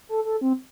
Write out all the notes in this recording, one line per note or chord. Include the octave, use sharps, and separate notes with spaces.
A4
A4
C4